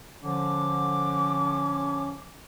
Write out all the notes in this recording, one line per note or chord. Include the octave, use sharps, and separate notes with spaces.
D3 F3 C#4 D6